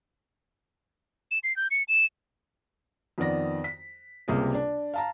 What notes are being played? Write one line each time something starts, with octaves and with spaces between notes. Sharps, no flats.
E7
C7
G6
C#7
E7
F2 D#3 B3 D5 A#6
B6
C#2 C3 G3 A#3 G#4 A#4
D4
F5 A5 A#5